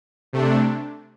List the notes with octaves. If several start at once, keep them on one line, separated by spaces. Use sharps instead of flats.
C3 A3 D4